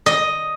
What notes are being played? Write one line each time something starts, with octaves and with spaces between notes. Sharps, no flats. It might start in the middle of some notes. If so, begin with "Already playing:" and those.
D#5